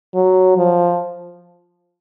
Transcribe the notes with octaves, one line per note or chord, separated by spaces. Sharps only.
F#3
F3